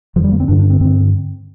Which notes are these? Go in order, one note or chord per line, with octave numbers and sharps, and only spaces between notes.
F2 D3 F3
G3
A#3
C4
G2 D3 D4
D4
C4
G2 D3 C4